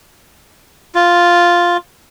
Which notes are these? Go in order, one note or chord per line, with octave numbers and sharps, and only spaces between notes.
F4